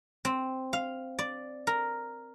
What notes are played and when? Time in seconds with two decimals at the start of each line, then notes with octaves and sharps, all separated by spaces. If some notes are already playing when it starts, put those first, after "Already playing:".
0.25 C4
0.73 F5
1.19 D5
1.67 A#4